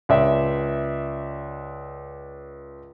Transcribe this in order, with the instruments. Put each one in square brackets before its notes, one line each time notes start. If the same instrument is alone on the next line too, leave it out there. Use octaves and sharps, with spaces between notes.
[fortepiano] C#2 D5 E5